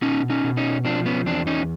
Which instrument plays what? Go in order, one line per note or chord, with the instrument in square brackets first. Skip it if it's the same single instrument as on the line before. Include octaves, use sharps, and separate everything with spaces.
[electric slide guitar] B2 C#4 D#4
C#4 D#4
B2
C#4 D#4
F3 C4 D4
B3 C#4
E2 C4 D4
C#4 D#4